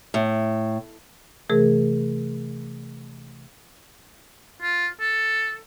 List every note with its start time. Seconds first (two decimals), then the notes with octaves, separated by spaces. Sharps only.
0.14 A2
1.50 C3 E3 A3 G#4 A#4
4.62 F4
5.01 A4